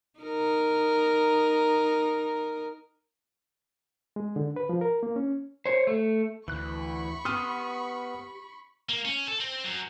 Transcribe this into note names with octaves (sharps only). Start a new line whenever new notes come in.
D#4 A#4
G#3
D3
B4
F3
A#4
A#3
C#4
C5 C#5
A3
D2 E3 B5 C#6 F#6
B3 G4 C6 D#6 F6 D#7
A#3
C#4
A4
C4
F#2